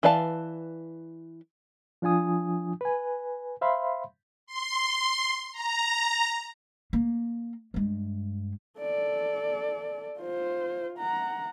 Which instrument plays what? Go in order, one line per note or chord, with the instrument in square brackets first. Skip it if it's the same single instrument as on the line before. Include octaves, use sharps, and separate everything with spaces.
[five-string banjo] E3 B4 D5 F5 A5
[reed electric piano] F3 D4 F4 G#5 D#6
B4 G#5
C5 E5 F5 B5 C6
[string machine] C6
A#5
[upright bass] A#3
G2 G#3
[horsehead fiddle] A4 D5
F4 C5
F#5 A#5